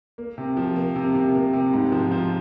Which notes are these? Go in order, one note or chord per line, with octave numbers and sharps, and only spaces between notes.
A#3
C3
F3
A#3
C3
C3
A#3
C3
G#2
F3
F3